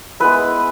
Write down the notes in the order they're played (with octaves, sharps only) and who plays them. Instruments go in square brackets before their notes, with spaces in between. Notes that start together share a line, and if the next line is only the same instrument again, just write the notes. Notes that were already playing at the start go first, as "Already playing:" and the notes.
[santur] G#3 B3 E4 B4